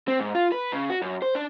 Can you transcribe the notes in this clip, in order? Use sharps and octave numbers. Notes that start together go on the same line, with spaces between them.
C4
G#2
F4
B4
C#3
F#4
F#2
C5
D4